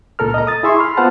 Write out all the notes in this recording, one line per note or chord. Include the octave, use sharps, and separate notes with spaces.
C#2 A#2 A4 A#4 F6
D#5 A#5
D#6 A6
E4 G#4 E5 C6 C#6
B5 C6 F6
B3 F4 B4 C5 F#5 A5